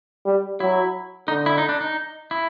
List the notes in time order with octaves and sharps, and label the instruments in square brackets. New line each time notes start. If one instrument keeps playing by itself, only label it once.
[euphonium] G3
[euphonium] F#3 [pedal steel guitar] E4
[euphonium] D3 [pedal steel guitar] D#4
[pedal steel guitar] E4
D#4
D4
D#4
E4